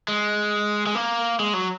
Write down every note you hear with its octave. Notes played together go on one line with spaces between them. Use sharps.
G#3
G#3
A#3
G#3
F#3